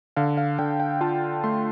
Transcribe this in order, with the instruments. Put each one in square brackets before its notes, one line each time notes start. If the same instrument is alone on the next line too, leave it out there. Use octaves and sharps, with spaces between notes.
[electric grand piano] D3 F5
F5
D3 G5
G5
F4 A5
A3 C6